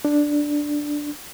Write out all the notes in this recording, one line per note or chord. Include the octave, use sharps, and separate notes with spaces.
D4